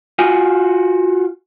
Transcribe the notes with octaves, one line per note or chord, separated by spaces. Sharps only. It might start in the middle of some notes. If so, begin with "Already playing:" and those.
F4 F#4 G#5